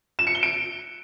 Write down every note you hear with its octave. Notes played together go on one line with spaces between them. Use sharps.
E7
C#7
G7
D7